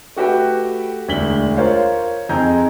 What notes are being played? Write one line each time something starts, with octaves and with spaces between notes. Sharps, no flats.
A3 F#4 G4 B4 G5
E1 D2 D4 B6 F#7 G7
F4 A#4 C5 C#5 F5
F2 C4 D#4 G#4 A#5 G6